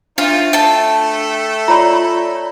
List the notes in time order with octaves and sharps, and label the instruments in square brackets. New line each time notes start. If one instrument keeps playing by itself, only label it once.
[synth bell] D4 E5 [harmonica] D#4 C5 F5 [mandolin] F4
[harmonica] A3 [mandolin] G5 A5
[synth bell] F4 C#5 D5 [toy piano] A#5 B5